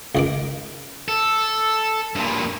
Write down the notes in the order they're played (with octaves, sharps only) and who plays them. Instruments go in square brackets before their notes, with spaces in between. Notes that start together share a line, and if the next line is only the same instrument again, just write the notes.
[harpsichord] C#2 D#3 D6
[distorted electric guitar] A4
G2 A#2